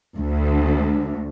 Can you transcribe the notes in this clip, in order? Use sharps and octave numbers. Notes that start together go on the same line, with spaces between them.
D2